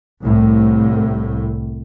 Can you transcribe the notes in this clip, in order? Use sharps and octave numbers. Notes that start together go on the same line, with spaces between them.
C2 A2